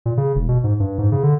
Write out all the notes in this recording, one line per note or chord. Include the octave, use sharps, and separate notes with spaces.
A#2
C#3
E1
B2
G#2
G2
G#2
C#3
D3